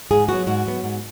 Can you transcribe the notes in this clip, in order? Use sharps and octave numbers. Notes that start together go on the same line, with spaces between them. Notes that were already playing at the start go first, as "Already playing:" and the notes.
G#2 G#4
F#3 B3 F#4
G#2 F#4
F#3 B3
G#2